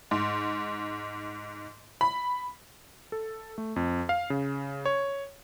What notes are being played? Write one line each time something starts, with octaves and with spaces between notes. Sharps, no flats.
G#2
B5
A4
A3
F2
F5
C#3
C#5